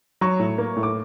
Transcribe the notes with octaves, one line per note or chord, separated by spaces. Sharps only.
F#3 C#5 C#6
A2
A#3
A2
D6